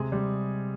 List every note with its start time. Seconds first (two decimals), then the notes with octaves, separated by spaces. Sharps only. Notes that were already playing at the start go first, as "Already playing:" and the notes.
Already playing: C3 G#3 G#4
0.12 G3